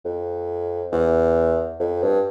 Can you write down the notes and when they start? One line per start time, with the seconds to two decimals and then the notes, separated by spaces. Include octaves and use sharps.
0.05 F2
0.92 E2
1.80 F2
2.03 G2